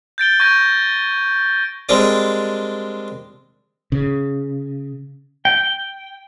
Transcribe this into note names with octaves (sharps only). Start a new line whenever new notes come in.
G6 A6 D7 G7
C#6 G6 G#6 A#6
G3 G#3 C4 D4 A#4 D5
C#3
G5